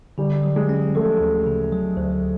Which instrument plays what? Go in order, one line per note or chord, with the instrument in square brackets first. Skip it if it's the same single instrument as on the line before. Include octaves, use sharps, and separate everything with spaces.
[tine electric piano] D3 [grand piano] G3
[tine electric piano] F#3
[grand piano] G#3
[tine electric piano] C#4
[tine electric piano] F3 [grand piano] A3
[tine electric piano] D2
C#3
F#3
D2